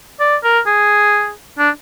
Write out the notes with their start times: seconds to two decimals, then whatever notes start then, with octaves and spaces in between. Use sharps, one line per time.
0.20 D5
0.44 A#4
0.66 G#4
1.59 D4